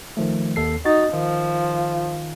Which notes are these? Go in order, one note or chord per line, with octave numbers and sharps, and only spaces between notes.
D#3 F3 A3
D#2 A4 C7
D#4 F#4 A6
D#3 F3